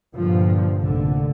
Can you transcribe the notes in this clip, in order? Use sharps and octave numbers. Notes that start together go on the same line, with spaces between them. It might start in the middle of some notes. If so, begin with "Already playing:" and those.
G2 A#2 D3 F3
F1 A#1 D3